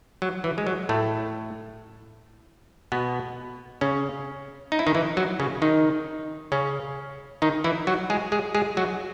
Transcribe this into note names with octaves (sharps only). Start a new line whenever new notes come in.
F#3
E3
G#3
F#3
A2 A3
B2 B3
C#3 C#4
D#4
E4
D#3 D#4
E3 E4
F#3 F#4
C#3 C#4
D#3 D#4
C#3 C#4
D#3 D#4
E3 E4
F#3 F#4
G#3 G#4
G#3 G#4
G#3 G#4
F#3 F#4